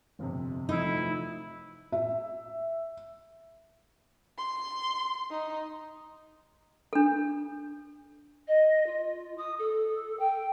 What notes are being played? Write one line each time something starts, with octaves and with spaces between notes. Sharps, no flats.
G1 F2 C3
E3 F3 A3 D#4 E4
E5
C6
D#4
D4 A4
D#5
F4
D#6
A4
G5